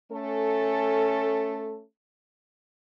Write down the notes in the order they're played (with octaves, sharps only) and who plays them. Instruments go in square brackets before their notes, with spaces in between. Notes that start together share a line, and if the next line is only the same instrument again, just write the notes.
[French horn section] A3 C#4 A4